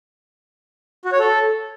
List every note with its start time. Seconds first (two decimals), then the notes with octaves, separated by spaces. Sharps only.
1.05 F#4
1.12 C#5
1.20 A4